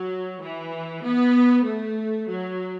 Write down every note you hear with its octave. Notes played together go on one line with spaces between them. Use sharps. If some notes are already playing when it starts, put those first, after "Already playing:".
Already playing: F#3
E3
B3
A3
F#3